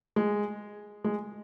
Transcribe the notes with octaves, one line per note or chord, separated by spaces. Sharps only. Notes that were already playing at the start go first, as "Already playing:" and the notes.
G#3
G#3